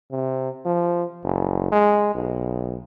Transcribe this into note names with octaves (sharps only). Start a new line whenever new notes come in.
C3
F3
F#1
G#3
B1